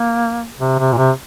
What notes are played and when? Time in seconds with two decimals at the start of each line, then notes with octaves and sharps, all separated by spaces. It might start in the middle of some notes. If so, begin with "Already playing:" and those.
Already playing: A#3
0.60 C3
0.79 C3
0.93 A#2
0.97 C3